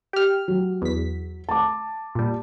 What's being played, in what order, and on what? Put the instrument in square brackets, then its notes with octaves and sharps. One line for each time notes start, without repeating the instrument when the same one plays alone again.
[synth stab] G4 F6
[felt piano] F#3
[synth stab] E2 B6
[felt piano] A5 D6
[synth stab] A#2 G3